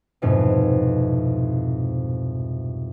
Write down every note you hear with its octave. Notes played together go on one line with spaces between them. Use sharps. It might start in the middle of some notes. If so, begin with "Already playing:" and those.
C2 F2 G#2 B2